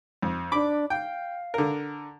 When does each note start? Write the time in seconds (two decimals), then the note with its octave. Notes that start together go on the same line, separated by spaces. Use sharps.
0.22 F2
0.52 D4 B5 D6
0.90 F5 G5
1.54 D3 A#4